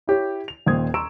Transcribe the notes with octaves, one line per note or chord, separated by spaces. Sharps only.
E4 G4 C#5
F7
D#1 D#2 A#2 C5 D#6 G#6
A#5 C6 C#6 E6 D7 E7